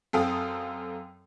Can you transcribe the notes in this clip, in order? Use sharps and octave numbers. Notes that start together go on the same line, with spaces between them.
F#2 C4 A4 F5 G5 D#6